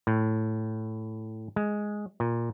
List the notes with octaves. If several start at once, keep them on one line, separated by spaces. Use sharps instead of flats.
A2
G#3
A#2